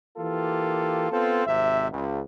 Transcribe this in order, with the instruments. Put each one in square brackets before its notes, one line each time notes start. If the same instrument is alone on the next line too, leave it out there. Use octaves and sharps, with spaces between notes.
[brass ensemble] E3 A#3 F4 G4 A4
B3 C4 F4 A4
G#1 C3 E5
C#2